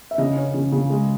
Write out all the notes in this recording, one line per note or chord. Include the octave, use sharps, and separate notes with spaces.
E5
C#3 D#5
C#4
C#3
C#3
G#3